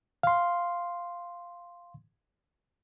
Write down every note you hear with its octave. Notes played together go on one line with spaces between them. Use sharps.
F5 C6